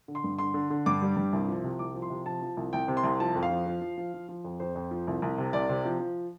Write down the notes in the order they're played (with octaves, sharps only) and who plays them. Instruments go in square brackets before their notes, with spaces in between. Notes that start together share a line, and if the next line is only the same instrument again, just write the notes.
[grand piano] D3
C6
G2
D3 C6
D3
D3
G2 D6
G3
G2
C2
F3
C3
C2 D6
F3
C6
C3
F3 A5
F3
C2
C2 G5
C3
C6
C2
F3 A5
F2
F5
F3
F3
F3
F3
F3
F3
F2
F2 C5
F2
F3
C2
C2
C3
C2 D5
C3
F3
F3